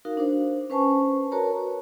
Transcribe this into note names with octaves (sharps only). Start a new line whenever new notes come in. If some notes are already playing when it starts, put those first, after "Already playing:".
D#4 F#4 A#4 F5
D4 C5
C#4 B4 C5 G#5 A5 C#6
F#4 A#4 B4 C#5 A5 A#5
C#5